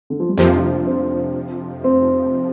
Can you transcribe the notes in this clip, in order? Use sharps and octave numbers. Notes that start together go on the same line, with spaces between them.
D3
F3
G3
F2 C3 F3 A#3
D4
C4
C4